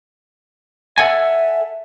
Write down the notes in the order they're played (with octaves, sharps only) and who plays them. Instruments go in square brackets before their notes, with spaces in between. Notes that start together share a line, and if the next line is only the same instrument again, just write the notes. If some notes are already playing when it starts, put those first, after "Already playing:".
[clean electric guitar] A4 F#5 G#5 [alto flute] E5